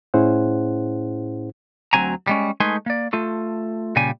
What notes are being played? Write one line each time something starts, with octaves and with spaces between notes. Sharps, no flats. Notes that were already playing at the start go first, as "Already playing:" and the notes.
A2 C#4 E4 G#4 C5 F#5
D2 G#2 F#3 C4 G#5 A#5
G3 G#3 C#4
G#3 A3 D#4 B4 G#5 C6
A#3 D5
A3 F4 A4
A#2 C#3 G3 G#5